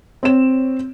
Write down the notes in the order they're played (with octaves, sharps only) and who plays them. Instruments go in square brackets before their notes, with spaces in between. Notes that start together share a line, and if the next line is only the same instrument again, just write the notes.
[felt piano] C4 C#5 E7